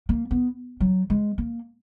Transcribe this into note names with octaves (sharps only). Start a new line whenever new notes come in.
A#3
B3
F#3
G#3
A#3